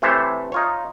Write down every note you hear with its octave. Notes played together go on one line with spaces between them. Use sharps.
C3 E3 A3 C5 C#5 E5
D#4 F4 C#5